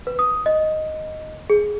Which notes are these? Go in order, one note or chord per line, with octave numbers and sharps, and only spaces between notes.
B4
D#6
D#5
G#4